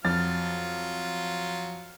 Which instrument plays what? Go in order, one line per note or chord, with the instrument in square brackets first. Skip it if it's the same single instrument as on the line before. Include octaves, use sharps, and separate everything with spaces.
[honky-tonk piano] F2 A6 [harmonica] F#3 F4 F6